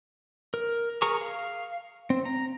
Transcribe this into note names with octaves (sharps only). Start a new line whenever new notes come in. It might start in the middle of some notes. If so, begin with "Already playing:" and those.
A#4
G#4 A#4 A#5 C#6
F5
C4
A#5